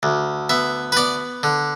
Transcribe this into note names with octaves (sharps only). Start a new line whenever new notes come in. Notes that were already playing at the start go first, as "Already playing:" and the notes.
D2
B3 E5
B4
B3 D5
D3